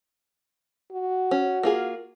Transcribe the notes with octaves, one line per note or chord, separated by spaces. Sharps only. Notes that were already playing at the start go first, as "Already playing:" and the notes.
F#4
C#4
A#3 F4 G#4